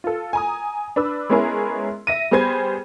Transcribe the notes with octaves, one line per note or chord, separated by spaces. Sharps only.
F4 A4
G#5 A#5 D#6
D4 B4 E6
G#3 B3 C#4 E4 G#4 A#4
E5 A#6 D#7
G3 B3 G#4 C5 B5 G#6